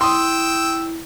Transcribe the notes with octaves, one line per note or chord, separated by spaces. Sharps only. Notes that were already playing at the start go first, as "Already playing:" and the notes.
E4 G5 C6 D#6 E6